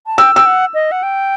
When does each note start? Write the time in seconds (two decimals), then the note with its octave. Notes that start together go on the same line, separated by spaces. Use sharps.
0.06 A5
0.18 G5 E6
0.35 G5 E6
0.46 F#5
0.74 D#5
0.91 F#5
1.03 G5